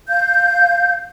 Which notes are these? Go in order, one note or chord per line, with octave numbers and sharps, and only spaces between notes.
F5 G6